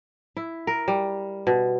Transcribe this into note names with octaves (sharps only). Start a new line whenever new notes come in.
E4
A#4
G3
B2